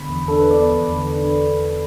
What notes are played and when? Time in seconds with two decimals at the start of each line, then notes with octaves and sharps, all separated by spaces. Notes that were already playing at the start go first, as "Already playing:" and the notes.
Already playing: D3 B3 B5
0.09 E2
0.28 D4 A4
0.40 B4
0.50 B3 D5
0.72 E2
0.93 D3
1.14 D4